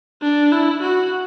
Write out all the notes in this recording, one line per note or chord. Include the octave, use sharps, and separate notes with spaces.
D4
E4
F#4